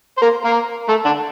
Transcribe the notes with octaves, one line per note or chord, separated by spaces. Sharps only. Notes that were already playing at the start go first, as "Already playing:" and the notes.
C5
A#3 A#4
A#3 A#4
A3 A4
D3 D4